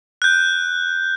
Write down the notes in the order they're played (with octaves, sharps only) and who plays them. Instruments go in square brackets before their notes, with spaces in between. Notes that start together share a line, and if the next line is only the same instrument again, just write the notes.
[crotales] F#6 G6